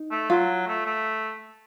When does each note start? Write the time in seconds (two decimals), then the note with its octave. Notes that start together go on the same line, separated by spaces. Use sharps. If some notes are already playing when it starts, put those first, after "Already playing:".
Already playing: D#4
0.11 A3
0.30 F#3 F4
0.67 A3
0.86 A3